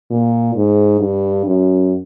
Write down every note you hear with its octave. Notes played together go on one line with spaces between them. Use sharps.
A#2
G#2
G2
F#2